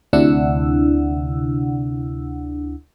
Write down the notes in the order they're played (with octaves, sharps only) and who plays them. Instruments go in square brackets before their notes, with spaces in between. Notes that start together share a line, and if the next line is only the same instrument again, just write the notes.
[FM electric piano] D2 C3 D4 E4 F#5 E6